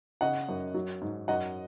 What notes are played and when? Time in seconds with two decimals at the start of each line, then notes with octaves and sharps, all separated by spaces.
0.21 C#3 D#5 F#5
0.49 F#2
0.74 F#3
1.02 G#2
1.28 F#2 D#5 F#5